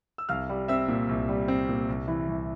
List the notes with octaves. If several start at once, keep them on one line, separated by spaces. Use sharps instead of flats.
E6
C2 F5 F6
G3
C4 E5 E6
A#2
C2
G3
C4
A#2
C2
E3
C2